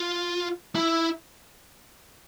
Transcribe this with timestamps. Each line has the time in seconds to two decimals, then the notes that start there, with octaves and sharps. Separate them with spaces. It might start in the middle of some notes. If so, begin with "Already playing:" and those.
Already playing: F4
0.75 E4